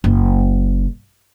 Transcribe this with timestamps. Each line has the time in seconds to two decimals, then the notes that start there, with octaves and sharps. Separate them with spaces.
0.04 F#1